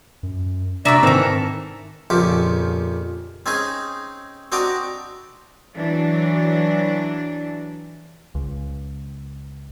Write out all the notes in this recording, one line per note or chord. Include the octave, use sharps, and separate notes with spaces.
F#2
C3 A#3 D4 F#4 D5 E5 E6
G#2 D#3 E3 C4 A4 A#4
A#1 F2 C#3 F3 G4
C4 C#4 D#4 G#4 G#5
C4 D4 F#4 D#5 G5 A#5
E3 F#3 D4
C#2